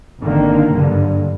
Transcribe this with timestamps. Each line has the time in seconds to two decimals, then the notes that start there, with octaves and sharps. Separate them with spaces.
0.21 G#1 D3 D#3 A#3
0.72 F#1 G2 D3